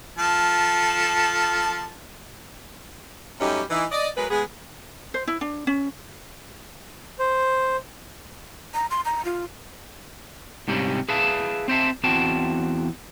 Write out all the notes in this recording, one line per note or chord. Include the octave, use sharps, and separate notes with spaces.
F3 A4 A5
F#2 G3 A3 C#4 D#4 G4
E3 D#4
D5 D#5
F#3 G#3 A#4 B4
G#3 B3 G#4
C5
E4
D4
C#4
C5
A#5
C6
A#5
F4
G#2 C3 G3 C4 C#4
G#4 B4 E5 F5 A5
C4 C5 E5 A5
E2 C4 F#4 G5 A5